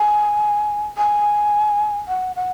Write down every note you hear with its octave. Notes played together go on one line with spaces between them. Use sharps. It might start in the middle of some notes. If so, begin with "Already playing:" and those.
Already playing: G#5
G#5
F#5
F#5